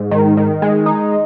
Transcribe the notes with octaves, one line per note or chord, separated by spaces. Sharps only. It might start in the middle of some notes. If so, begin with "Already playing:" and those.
Already playing: G#2
D#3
D#3
G#3
D#4